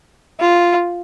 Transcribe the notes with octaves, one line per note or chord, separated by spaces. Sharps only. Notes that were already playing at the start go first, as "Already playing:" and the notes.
F4